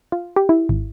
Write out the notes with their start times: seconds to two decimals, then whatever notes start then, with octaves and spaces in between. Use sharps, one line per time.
0.12 F4
0.36 G4
0.49 E4
0.69 G#1